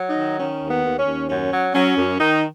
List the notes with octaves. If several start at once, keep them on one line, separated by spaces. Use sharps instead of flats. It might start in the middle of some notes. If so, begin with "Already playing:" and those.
Already playing: F#3
D#4
D#3
D#3 C#4
D#2
B3
D#2
C#4
D#2
F#2 C#4
F#3
F#3 C#4
F#2
D#3 D#4